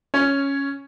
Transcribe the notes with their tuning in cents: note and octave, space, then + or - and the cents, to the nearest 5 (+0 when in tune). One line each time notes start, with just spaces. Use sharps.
C#4 +0 C#5 +0